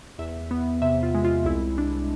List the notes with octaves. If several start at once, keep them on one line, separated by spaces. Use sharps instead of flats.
E2 E5
B3
C3 E5
F4
G#3
F4
C2 E4
D4